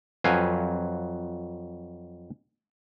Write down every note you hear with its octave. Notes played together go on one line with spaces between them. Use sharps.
F2 F#3 B4 C5 F5 G#5